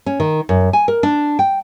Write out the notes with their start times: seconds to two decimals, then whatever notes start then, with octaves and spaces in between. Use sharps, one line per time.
0.06 C#4
0.20 D#3
0.49 F#2
0.73 G#5
0.88 A#4
1.03 D4
1.39 G5